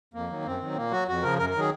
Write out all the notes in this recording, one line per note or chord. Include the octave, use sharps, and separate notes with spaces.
F2 A#3
D#3 F#3
F#2 C4
D#3 F#3
A#2 A#3
F#3 F#4
F2 F#4
C#3 F3 A#4
F#2 A#4
A#4
D#3 F#3 G#4